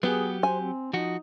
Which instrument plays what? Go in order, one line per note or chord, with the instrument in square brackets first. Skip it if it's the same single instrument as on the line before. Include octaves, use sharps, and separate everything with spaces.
[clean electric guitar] F#3 G4 [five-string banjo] B3 [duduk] G#4
[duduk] C5 [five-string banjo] G#5
[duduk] C4
[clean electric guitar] F3 F#4 [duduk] D#4